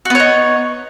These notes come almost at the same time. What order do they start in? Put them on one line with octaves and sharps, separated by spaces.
F#4 B3 C#5 D#4